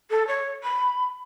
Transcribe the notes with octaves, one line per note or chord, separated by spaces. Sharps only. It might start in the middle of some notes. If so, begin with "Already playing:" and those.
A4
C#5
B5